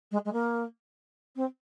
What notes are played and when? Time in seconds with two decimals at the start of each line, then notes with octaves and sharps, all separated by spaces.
0.11 G#3
0.25 G#3
0.32 A#3
1.36 C4